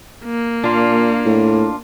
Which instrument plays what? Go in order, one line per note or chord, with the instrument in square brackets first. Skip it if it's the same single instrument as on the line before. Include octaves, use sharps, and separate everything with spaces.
[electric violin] A#3
[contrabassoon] A#2 [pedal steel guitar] D4 F4
[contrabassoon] A2